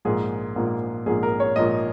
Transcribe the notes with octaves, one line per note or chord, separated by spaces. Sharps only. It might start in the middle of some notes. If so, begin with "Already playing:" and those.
A#1 G#2 F3 A#3 G#4
A#1 G#2 F3 A#3
A#1 G#2 F3 A#3 G#4
A#4
C#5
A#1 G#2 F3 A#3 D#5